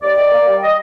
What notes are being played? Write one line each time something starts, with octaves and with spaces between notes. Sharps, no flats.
D#2 D5
D#3
A#3
G3
D#5